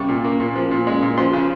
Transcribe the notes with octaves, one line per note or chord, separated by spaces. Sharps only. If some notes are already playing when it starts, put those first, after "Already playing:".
Already playing: C3 G3 C#6
A#2
A#3
A#2
F3
A#2
G#3
A#2
F3 C6
C#3